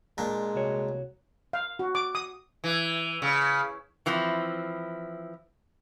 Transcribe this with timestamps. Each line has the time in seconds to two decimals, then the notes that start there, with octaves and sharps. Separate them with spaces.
0.18 A#2 G#3 D4
0.55 C2 F#4 C#5
1.53 F5
1.79 F#4
1.95 D6
2.15 D#6
2.64 E3
3.22 C#3
4.06 E3 F3 C4 E4